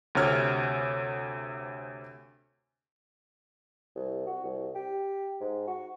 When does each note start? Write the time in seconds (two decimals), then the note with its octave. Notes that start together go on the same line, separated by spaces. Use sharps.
0.15 D2 C3 C#5 F6 G#6
3.96 C2
4.27 F#4
4.44 C2
4.75 G4
5.41 G#2
5.68 F#4